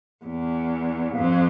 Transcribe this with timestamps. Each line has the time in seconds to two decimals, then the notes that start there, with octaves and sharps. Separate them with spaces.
0.25 E2
1.16 F2